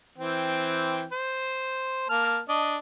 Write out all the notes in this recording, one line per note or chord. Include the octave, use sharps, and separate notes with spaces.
E3 C4 G5
C5
A#3 A5 F6
D4 D#5